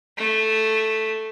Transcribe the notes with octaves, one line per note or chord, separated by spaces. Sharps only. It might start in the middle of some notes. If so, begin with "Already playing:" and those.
A3